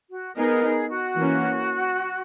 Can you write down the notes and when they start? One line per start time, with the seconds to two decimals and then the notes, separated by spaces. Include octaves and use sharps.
0.10 F#4
0.36 B3 D#4 G#4 A#4
0.63 G#4
0.89 F#4
1.16 E3 A#3 C#4